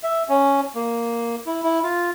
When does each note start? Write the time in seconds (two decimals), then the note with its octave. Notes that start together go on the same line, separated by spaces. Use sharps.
0.03 E5
0.29 C#4
0.75 A#3
1.46 E4
1.63 E4
1.84 F4